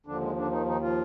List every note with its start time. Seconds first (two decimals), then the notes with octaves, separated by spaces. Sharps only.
0.06 D#2 D3 F3 D4
0.21 G#3
0.36 D3 D4
0.51 D#3 D#4
0.66 D#3 D#4
0.81 F3 F4